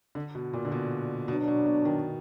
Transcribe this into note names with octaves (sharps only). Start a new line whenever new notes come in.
D3
B2
A#2
D3
B2
B2 F#3 B3 D4
B2
B2
D#3